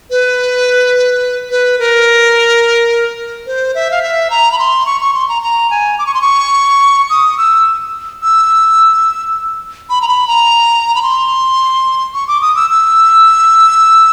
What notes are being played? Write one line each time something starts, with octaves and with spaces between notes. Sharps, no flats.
B4
B4
A#4
C5
E5
F5
E5
A#5
B5
C6
C#6
C#6
C6
A#5
A#5
G#5
D6
C#6
C6
C#6
D#6
E6
E6
B5
A#5
B5
A#5
B5
C6
C#6
D6
D#6
E6
E6